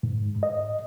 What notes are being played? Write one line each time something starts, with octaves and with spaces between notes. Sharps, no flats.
G#2
D#5